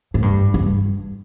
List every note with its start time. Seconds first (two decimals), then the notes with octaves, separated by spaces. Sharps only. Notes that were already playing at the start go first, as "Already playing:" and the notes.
0.14 A2
0.22 G2
0.54 G2